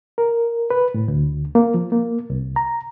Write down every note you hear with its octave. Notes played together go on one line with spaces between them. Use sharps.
A#4
B4
A2
D2
A#3
F3
A#3
C2
A#5